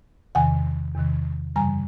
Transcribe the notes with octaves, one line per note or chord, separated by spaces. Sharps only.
E2 C3 D#3 F#5 G#5
E2 C3 D#3
F#2 C#3 E3 G3 G#5 A#5